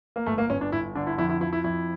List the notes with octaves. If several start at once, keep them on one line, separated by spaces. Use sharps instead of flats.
A#3
G1 A3
A#3
G1 C#4
D4
G1 E4
D3 D4
E4
F2 E4
E4
F3 E4
E4
F2 E4